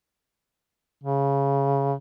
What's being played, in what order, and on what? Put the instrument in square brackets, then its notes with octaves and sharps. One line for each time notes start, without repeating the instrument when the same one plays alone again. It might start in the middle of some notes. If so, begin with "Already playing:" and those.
[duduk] C#3